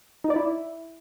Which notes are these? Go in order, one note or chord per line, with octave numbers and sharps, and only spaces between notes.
D#4
D5
E4